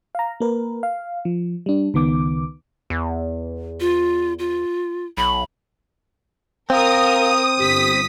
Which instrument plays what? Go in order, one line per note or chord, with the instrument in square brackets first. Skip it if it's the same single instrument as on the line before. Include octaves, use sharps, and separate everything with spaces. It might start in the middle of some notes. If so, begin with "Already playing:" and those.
[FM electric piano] F5 A#5
A#3 A#4 B4
F5
F3
G3 D4
C#2 D#3 B3 D6
[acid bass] E2
[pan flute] F4
F4
[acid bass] B1 [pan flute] B5
[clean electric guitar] C4 [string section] A#4 [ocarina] F5 [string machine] D#6
[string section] G1 B6 [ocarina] G4